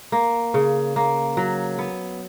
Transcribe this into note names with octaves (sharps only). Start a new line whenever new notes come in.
A#3
C#3
A#3
F#3
B3